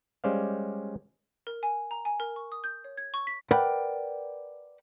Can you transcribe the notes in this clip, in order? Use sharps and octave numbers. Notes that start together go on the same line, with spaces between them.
G3 G#3 C#4 C5 D5 F5
A#4
G#5
A#5
G#5
A#4
C#6
D#6
G6
C#5
G#6
C#6
B6
A#4 B4 D5 F#5 G5 B5